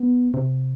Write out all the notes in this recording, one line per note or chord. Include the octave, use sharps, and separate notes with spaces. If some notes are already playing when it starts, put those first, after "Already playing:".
Already playing: B3
C3